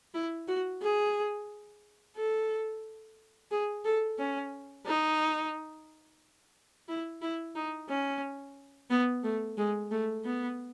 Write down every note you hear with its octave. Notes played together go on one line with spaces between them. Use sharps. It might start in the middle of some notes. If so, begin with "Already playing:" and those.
E4
F#4
G#4
A4
G#4
A4
C#4
D#4
E4
E4
D#4
C#4
B3
A3
G#3
A3
B3